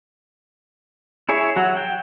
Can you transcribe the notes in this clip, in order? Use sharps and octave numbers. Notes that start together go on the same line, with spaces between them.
E4 G#4 C#5 E5
F#3 F#4
G5